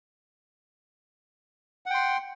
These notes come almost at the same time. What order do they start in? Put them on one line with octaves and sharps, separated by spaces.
F#5 G5 C6